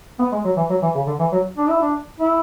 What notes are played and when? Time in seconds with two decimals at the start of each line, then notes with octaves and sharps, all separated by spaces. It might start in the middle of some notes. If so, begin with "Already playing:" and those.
0.19 B3
0.32 G#3
0.45 F#3
0.57 E3
0.70 F#3
0.82 E3
0.95 C#3
1.07 D3
1.19 E3
1.32 F#3
1.58 D4
1.69 E4
1.81 D4
2.20 E4